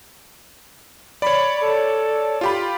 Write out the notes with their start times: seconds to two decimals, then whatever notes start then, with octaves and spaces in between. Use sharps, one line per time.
1.22 C#5 D5 B5
1.61 A4
2.41 F4 G4 B5